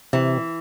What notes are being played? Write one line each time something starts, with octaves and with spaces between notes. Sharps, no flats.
C3 E3